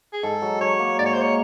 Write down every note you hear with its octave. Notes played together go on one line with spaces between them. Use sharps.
G#4
G#2 A4
F#3
F#3 C#5
A#3
G#2 D5
C#5
C5
A#3 C#5